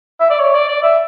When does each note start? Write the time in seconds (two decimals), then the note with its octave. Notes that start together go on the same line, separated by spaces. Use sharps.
0.20 E5
0.30 D5
0.40 C#5
0.55 D5
0.69 D5
0.83 E5